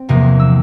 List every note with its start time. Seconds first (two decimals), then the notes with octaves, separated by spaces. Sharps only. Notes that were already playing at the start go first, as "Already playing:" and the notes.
Already playing: C4
0.09 E2 C3 F3 A#3
0.40 E6